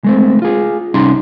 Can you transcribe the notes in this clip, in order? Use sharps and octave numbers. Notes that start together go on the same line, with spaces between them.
G#3 A3 C4
F4 G#4
C2 G3 C#4 D#4 C6